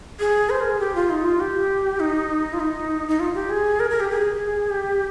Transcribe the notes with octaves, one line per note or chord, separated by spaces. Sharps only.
G#4
C5
A#4
G#4
G4
F4
D#4
F4
G4
D#4
F4
D#4
D#4
F4
G4
G#4
A#4
A#4
G4
G#4
G4